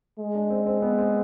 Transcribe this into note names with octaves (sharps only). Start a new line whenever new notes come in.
G#3
D4
C4
C4
B3
C4